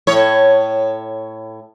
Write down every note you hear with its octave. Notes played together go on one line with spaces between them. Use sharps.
A2 C#5